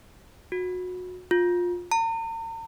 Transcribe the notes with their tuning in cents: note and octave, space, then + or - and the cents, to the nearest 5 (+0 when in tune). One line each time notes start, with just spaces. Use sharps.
F#4 -25
F4 +20
A#5 -45